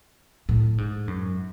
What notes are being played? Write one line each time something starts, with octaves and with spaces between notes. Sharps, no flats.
A2
G#2
F#2